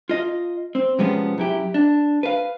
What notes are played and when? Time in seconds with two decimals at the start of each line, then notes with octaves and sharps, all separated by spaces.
0.09 F4 D#5
0.75 C4
0.99 C3 F3 G#3 B3 C#4
1.38 F#2 E4 G4
1.74 D4
2.23 B4 F5